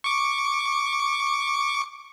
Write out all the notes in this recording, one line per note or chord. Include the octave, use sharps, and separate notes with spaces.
C#6 D6